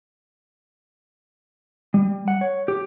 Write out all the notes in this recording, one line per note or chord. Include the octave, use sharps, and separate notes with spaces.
G3
F#5
C#5
G4